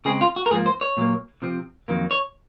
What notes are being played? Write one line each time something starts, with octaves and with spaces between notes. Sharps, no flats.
C#3 G#3 C4 G#4
F4
F#4
A#4
G#2 F3 A#3 G#4
C5
C#5
A#2 F#3 A#3
C3 F3 C4
F2 D#3 F#3 A#3
C#5